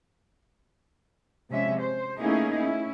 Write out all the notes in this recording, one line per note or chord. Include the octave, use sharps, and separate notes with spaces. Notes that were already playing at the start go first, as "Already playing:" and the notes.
C3 F3 G#3 C#4 E5
C5
A3 A#3 C#4 D#4 E4 G#4
C#4 E4